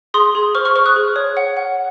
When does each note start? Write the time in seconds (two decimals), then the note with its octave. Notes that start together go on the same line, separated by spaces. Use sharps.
0.14 G#4 C6 D#6
0.35 G#4
0.55 C5 C#6 F6
0.65 C#6 F6
0.76 C5 C#6 F6
0.86 D#6 F#6
0.96 G#4
1.16 C#5
1.37 F#5
1.57 F#5